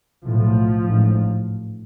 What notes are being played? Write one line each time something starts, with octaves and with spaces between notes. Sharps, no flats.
B1 A2 F3
A1 G#2